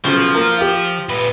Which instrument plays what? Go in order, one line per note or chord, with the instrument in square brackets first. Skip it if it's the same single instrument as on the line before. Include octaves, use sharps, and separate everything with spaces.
[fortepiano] B1 C#3 [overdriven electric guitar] F3
[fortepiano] A#3 A#4
F4 G4
[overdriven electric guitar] A#2 B4